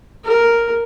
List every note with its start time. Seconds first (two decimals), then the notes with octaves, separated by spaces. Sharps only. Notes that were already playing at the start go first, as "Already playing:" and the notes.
0.24 A#4